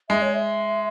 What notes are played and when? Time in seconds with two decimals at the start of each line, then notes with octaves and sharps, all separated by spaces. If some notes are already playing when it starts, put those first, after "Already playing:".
0.09 G#3 E5
0.22 C#5
0.34 E5